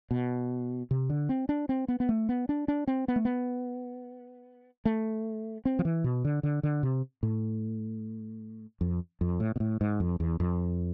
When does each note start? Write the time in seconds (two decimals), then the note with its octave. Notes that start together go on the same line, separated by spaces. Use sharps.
0.11 B2
0.91 C3
1.10 D3
1.29 C4
1.49 D4
1.69 C4
1.88 B3
2.00 B3
2.09 A3
2.29 B3
2.49 D4
2.68 D4
2.87 C4
3.08 B3
3.16 A3
3.25 B3
4.85 A3
5.65 C4
5.79 F3
5.85 E3
6.04 B2
6.25 D3
6.43 D3
6.63 D3
6.83 C3
7.23 A2
8.81 F2
9.21 F2
9.40 A2
9.56 B2
9.60 A2
9.81 G#2
10.00 F2
10.20 E2
10.40 F2